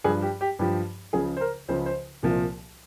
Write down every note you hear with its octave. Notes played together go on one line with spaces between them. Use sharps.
G2 F3 G#4
G4
G4
G2 F3 G4
C#2 C#3 F3 G#4
C5
A#4
C#2 C#3 F3 C5
C5
C2 A#2 F3